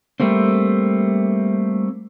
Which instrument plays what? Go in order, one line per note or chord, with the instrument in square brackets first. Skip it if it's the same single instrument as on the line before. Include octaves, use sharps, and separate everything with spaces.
[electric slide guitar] G3 A3 A#3 C4